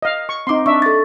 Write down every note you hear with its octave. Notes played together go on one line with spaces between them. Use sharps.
D#5 F5
C#6
C4 D#4 C6 D6
D4 E5 C#6
A4 A6